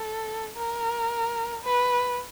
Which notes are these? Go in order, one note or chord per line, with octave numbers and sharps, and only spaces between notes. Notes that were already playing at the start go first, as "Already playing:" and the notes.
Already playing: A4
A#4
B4